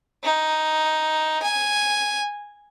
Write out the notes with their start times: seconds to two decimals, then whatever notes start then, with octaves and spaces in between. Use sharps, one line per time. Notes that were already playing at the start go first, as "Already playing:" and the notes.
0.24 D#4
1.43 G#5